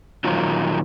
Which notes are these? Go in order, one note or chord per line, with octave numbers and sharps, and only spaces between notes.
A#2 D#3 F#3 F4